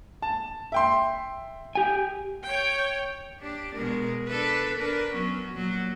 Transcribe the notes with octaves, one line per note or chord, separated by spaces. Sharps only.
A5
E5 G5 C6
G4 G#5
C#5 G5
D4 G4
B2 G#3 A#4
D4 A4 B4
D4 A#4 B4
F#3 B3 C#4
A#2 F#3